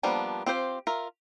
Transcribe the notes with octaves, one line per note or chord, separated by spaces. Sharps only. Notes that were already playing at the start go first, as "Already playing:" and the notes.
F3 G3 A#3 B3 D4
C4 F4 G4 C5
F4 A#4 E5